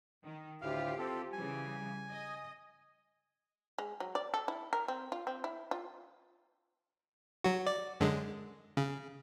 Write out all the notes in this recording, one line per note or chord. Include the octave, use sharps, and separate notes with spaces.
D#3
D2 A2 F4 G4 F5
C4 A4
C#3 E3 G3 G#5
D#5
G#3
F#3
D5
A4
E4
A#4
C4
F4
C4
E4
F4
F#3 F#4
D5
F#2 D3 G#3
C#3